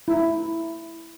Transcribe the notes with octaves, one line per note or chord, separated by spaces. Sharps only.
E4